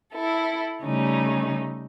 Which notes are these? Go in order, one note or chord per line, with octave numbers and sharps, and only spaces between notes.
E4 A4
C#3 G3 A3 C#4 D#4